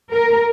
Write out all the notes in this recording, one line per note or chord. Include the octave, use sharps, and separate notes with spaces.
A#4